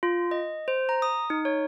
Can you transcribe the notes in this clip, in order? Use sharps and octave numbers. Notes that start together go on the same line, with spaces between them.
F4
D#5
C5
A#5
D#6
D#4
C#5